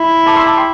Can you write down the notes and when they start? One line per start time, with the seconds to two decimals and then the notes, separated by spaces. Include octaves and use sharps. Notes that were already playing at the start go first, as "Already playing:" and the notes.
Already playing: E4
0.26 A5 D6
0.36 C6 E6
0.46 A5 D6
0.57 G5 C6